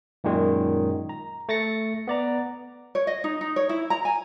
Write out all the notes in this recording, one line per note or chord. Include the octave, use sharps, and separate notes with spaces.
F#2 A#2 D#3 G#3
A#5
A3 A6 A#6 C#7
B3 D5 A#5
C#5
D#5
D#4
D#4
C#5
E4
A#5
G#5